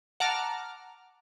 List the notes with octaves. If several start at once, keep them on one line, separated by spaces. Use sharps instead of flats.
F#5 A5 A#5 D6 F6